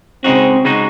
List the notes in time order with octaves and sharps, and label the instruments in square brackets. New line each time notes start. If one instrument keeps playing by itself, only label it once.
[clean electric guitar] C#3 G#3 D#4 F#4 [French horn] C4
[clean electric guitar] C#3 G#3 D#4 F#4